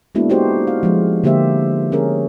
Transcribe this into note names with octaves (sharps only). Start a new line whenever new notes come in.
G#3 A#3 B3 D4 E4 F#4
D#4 E4 F#4 G4 A4 C5
F5
F3 G#3
D3 A#3 G4 C5 E5
C#4 G#4 A#4